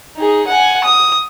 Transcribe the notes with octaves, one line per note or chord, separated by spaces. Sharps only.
D#4 G#4
F#5 G#5
D#6